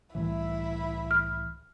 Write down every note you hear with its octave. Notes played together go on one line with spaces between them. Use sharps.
C2 A2 E3 E4 E5
F6